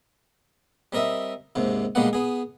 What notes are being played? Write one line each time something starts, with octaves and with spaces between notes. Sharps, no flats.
G3 C4 A#4 D#5 E5
D#2 G#2 C3
A#1 G3 G#3 A#3 B3 F#5
B3 G#4